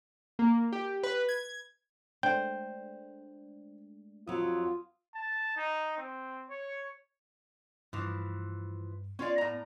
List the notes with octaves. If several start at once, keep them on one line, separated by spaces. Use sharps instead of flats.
A#3
G4
B4
G#6
G#3 A3 D4 C5 G5
F2 F#3 F4 D#6 E6
A5
D#4
C4
C#5
G2 E3 F3
B3 C#4 F4 D5 F5
A2 A#5